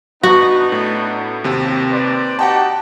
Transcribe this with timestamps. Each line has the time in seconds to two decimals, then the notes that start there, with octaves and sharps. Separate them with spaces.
0.23 B3 D4 D#4 F#4
0.72 A2
1.44 D#2 C3
1.90 B4 C5 D5
2.39 D#4 F#4 G4 F#5 G5 A5